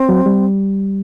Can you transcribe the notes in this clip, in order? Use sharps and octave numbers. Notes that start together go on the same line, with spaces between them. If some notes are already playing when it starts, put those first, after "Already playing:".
Already playing: C4
F#3
G3